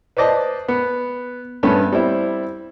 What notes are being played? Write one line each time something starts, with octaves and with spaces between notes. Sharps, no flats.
B4 C5 D5 D#5 A5
B3
G2 A3 B3 C#4
G3 C4 E4